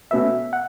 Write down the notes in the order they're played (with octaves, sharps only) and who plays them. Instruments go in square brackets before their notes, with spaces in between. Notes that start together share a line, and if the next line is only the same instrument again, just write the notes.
[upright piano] B2 A3 C#4 F#4 B4 [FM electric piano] E5
[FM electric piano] F#5